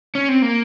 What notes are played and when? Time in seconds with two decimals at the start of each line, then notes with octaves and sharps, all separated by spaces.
0.15 C#4
0.29 C4
0.42 A#3